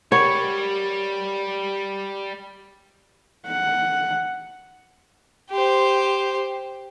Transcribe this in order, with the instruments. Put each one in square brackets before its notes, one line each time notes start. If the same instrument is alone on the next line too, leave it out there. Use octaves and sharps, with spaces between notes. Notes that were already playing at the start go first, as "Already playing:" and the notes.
[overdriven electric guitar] G3 [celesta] A#4 F#5 B5 [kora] C#5
[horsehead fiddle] F#5
[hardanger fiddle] G4 C5